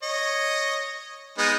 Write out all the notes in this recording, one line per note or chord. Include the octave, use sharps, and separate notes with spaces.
C#5 D#5
G#3 B3 D#4